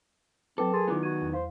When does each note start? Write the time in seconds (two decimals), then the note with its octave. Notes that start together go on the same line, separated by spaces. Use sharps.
0.58 F#3 C4 A4 B4 D6
0.73 G#4 A#4 C6 A6
0.88 D#3 B3 E4 F4 D6
1.03 F#4 G#6 D#7
1.21 E2
1.33 C5 F5